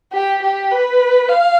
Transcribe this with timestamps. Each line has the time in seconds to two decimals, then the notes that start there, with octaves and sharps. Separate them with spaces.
0.13 G4
0.42 G4
0.71 B4
1.29 F5